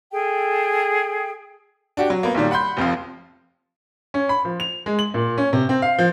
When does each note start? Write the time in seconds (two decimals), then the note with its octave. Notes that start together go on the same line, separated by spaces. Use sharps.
0.12 G#4 A4 G5
1.97 D4 F#4 G4
2.10 F#3
2.23 A#3 B3
2.35 B1 A#2 D#3 G3
2.51 F#5 B5 C6 G6
2.77 F1 F2 F3 F5
4.14 C#4
4.29 B5
4.45 F3
4.60 F7
4.86 G#3
4.99 F#7
5.14 A#2
5.38 C#4
5.53 C3
5.69 C4
5.82 F5
5.98 F3